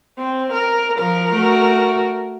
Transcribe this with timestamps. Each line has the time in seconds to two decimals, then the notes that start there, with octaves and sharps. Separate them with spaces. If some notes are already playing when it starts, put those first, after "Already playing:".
0.17 C4
0.53 A#4
0.99 F3 A#4
1.34 A3 F#4